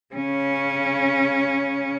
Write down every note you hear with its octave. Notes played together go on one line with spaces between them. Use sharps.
C#3 C#4